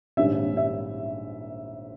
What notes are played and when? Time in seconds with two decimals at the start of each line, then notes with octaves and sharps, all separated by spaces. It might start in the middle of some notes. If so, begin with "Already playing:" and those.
0.17 A#1 G#2 D#3 G3 C#4 E5
0.57 E5